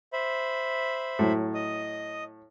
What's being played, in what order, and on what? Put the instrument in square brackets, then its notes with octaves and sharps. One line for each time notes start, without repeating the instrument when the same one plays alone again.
[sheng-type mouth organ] C5 E5 B5
[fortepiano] A2 F#3
[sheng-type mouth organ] D#5 D#6